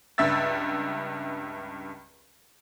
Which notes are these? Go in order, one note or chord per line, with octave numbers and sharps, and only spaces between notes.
C#2 G2 E5 E6 A6